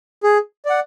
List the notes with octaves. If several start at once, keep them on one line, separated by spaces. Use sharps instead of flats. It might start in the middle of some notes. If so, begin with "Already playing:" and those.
G#4
D5 F#5